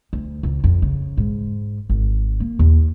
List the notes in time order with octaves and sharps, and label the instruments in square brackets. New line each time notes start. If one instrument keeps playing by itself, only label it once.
[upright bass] D2
C#2
F2
C#3
G#2
G#1
A#3
D#2